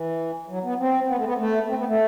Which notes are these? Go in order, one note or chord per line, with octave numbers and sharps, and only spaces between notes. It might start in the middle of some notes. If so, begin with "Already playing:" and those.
Already playing: E3
F#3
B3
C4
B3
A3
B3
A3
C4
B3
A3